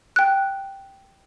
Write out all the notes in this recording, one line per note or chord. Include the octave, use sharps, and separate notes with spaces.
G5 F#6